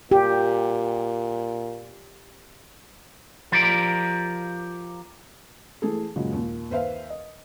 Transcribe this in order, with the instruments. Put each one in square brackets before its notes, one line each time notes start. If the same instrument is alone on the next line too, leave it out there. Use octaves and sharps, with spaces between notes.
[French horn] A#2 [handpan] G4
[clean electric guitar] F3 F4 G4 A#4 D5
[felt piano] E3 A3 G#4 A4
A#2 C#3 F#3 G#3
D#2 A#2
D#2 B4 C5 E5 F5
D#5